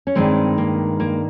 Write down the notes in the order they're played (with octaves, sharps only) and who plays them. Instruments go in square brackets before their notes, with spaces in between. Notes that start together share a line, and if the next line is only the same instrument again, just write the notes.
[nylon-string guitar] C#4
G2 D#3 G#3 C4
A#3
A#3